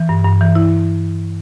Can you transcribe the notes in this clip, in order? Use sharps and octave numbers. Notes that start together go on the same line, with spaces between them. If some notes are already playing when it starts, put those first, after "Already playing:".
Already playing: E3
G2
G2
E3
E4